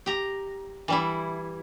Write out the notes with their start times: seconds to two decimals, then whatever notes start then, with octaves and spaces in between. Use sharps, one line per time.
0.06 G4 A#5
0.88 E3 G3 E4